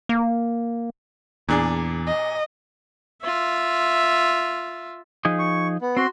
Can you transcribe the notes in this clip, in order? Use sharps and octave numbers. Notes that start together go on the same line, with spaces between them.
A#3
E2 A#2 D4 G#4
D#5
F4 E5
F3 D#4 G#4
C#6
B3
C4 F#4 C6